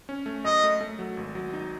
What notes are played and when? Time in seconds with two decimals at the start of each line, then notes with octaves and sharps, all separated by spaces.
0.09 C#4
0.26 A3
0.45 F#2 D#5
0.63 A3
0.81 A3
0.99 F#3
1.17 G#1
1.35 F#3
1.53 D#4